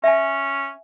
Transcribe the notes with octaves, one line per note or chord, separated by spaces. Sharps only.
C#4 E5 G#5